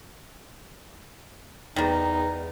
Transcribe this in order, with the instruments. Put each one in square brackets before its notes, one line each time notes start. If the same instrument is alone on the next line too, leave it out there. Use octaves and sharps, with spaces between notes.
[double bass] E2 [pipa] D#3 G3 [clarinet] D#4